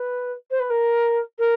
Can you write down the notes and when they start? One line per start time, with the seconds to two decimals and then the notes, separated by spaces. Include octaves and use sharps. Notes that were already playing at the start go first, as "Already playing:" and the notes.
Already playing: B4
0.51 C5
0.60 B4
0.70 A#4
1.39 A#4